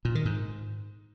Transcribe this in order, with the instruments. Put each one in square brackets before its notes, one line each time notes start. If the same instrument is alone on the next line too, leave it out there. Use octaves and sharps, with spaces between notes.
[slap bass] A#2
D#3
G#2